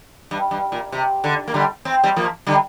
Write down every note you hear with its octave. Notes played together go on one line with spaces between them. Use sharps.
G2
G2
A#2
C3
D3
A#3
D3 G3
C4
G3 C4
F3 A#3
D3 G3